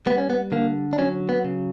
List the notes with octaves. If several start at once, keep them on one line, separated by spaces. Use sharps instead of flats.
G3 B3
C#4
B3
D3 A#3
D4
F#3 C#4
B3
C#3